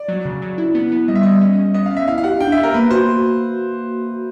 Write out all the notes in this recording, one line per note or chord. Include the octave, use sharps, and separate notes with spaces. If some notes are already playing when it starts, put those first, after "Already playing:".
Already playing: D5
F#3
C#3
F#3
E4
B3
B3
G3 D#5
E5
G3 D#5
C#4
C#4
B3 D#5
F5
B3
E5
E4 F5
F5
G4 F#5
D4 G5
E5
B3
A#4
A#3 B4
F#4 C5